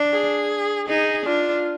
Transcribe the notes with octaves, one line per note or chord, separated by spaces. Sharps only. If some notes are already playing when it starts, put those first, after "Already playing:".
Already playing: D4
G#4
D#4 G#4
D4 F4